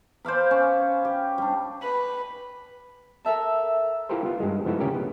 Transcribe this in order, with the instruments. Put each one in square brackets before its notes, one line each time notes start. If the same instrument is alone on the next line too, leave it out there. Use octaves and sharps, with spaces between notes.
[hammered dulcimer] C5 D5 F5 B5
C#4
G4
G3 D4
[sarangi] B4
[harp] A4 A#4 E5 A5
[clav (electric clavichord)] E4 F4 G4 A4 A#4 C5
B3 F4
G2 G#3
F3 B3 D#4 E4 F#4 A4
D2 C#3 C#4 G4 A#4
B3